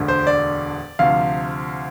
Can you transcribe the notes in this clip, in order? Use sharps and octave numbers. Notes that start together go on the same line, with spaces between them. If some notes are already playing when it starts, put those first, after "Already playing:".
Already playing: E1 D2 D3
C5
D5
D2 C3 F3 F5